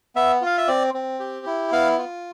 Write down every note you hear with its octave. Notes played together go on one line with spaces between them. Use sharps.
B3 E5
F4 F5
E5
C4 D5
C4
G4
E4
B3 F5
F4